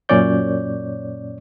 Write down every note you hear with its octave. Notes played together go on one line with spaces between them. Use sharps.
F#2 A#2 C#4 C#5 D5 G6